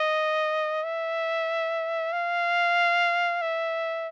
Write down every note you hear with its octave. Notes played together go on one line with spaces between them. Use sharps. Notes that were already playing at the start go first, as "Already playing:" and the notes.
Already playing: D#5
E5
F5
E5